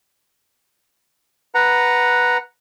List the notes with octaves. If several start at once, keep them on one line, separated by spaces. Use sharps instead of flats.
B4 F#5 A#5